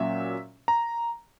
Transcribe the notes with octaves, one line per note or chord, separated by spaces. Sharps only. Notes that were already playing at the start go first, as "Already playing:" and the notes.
Already playing: A#2 F#3 C#4 E5
A#5